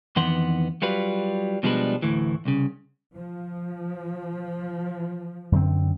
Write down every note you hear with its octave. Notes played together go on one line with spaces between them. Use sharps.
F2 D#3 E3 B3 F#5 C6
F#3 G3 F4 B4
B2 F3 G3 G#3 D4 B4
D2 A2 E3
C2 C#3
F3
F#2 D3 C4